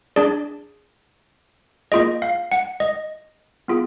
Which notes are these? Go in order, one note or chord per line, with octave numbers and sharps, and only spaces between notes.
D4 G#4 D5
A#3 F4 G#4 D#5
F5
F#5
D#5
B3 F4 G#4